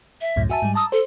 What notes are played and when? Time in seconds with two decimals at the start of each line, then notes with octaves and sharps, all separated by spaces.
0.21 E5
0.36 C#2 F#2 A2
0.49 F#4 E5 G#5 A5
0.62 G#2 G3
0.75 A5 A#5 D#6 E6
0.92 A4 C5